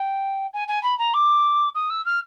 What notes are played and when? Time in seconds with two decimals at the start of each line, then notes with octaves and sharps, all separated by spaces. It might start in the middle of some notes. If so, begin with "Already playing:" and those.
Already playing: G5
0.53 G#5
0.68 G#5
0.83 B5
0.98 A#5
1.14 D6
1.75 D#6
1.90 E6
2.05 F6